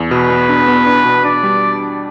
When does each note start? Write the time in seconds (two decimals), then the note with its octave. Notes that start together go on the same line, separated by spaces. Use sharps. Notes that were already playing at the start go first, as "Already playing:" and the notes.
Already playing: E2
0.11 B2 B4
0.30 B3
0.49 D4
0.68 B3
0.87 D4
1.05 B2
1.24 D4 D5
1.43 G3